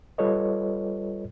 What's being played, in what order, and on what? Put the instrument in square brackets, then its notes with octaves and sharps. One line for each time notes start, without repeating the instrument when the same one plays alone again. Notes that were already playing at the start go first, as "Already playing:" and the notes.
[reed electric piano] G3 F4 A4 B4 C#5 D#5